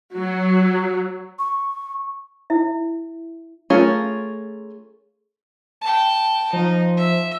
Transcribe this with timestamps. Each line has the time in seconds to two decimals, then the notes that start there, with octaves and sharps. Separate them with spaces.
0.16 F#3
1.39 C#6
2.50 E4 E5
3.70 A3 C#4 F4 G#4 A#4
5.81 G5 A5
6.53 F3 D#4
6.97 E5